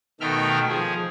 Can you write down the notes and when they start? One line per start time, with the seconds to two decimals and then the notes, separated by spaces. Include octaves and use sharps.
0.21 B2 D#3 A3 E5 G5 F6
0.68 F3 G#4